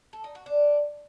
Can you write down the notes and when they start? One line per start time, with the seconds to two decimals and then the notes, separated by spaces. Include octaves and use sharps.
0.13 A4
0.24 D#4
0.35 F#4
0.46 D4